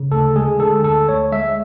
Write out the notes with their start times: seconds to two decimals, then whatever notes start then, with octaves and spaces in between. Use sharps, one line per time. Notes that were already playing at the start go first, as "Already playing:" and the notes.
Already playing: C#3
0.12 D2 A4
0.36 G#3 G#4
0.59 D3 A4
0.84 D2 A4
1.09 D2 C#5
1.32 G#3 E5